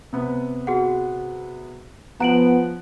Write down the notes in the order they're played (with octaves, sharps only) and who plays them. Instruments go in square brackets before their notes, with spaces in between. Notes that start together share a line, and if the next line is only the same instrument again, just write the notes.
[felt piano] C3 B3
[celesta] F#4 G#4 F#5
[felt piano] F3 F#5 [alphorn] B3 [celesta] A#5 D7 F#7